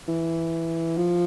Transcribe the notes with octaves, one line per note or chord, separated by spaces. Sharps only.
E3
F3